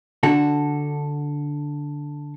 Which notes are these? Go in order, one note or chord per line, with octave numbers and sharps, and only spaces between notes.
D3 F#4 A4